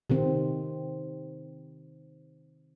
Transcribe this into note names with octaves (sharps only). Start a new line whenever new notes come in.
C3 D#3 C4